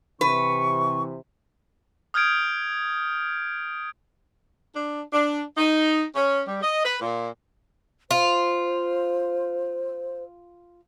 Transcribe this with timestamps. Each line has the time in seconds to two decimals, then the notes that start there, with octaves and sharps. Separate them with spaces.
0.21 C3 E3 B4 C#6
2.14 D#6 F6 G6 G#6 D7
4.76 D4
5.13 D4
5.57 D#4
6.16 C#4
6.48 G3
6.63 D#5
6.85 B4
7.01 A#2
8.11 F4 C5